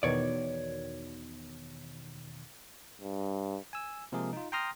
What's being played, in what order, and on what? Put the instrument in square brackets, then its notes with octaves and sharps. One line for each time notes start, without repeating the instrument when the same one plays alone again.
[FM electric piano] E2 B2 D#3 [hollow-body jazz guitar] C#5 D5
[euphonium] G2
[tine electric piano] G#5 E6
C3 F3 G#3 A#3 G#4 A#4
D#4 F4
G5 A#5 C6 D#6 F6 A#6